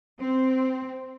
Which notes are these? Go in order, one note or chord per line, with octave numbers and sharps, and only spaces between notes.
C4